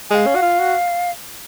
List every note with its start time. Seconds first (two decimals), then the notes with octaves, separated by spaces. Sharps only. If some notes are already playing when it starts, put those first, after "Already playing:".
0.10 G#3 F5 G#5
0.27 C#4
0.35 F#4
0.42 F4
0.59 F#4